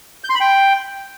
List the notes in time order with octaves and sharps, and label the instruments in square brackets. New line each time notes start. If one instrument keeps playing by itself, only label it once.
[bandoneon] G6
C6
B5
G5